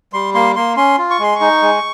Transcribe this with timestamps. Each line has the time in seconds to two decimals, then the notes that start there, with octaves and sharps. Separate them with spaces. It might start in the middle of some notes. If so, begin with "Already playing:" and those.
0.13 G3 C6
0.34 A#3 C6
0.56 A#3 C6
0.77 C#4 C6
0.98 F4
1.10 C#6
1.19 G#3 C6
1.35 C#6
1.41 D#4
1.62 G#3